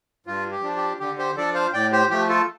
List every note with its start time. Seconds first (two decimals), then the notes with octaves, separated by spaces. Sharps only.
0.26 G2 F4
0.51 G4
0.63 F3 D4
0.76 G4
1.00 D3 G4
1.18 G4 C5
1.37 F3 D4 A4 D5
1.55 C5 F5
1.73 A2 D5 G5
1.92 G4 C5
2.10 F3 A3 G4
2.29 F4 A4